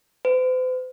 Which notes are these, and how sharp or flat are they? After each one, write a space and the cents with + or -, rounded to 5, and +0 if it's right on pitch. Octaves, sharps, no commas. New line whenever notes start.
C5 -45